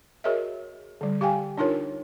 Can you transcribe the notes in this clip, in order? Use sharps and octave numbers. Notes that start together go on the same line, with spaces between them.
F#4 G#4 A#4 C#5 D#5 E5
D3 G3
G4 F5 G5 G#5
D4 D#4 F4 A#4 C#5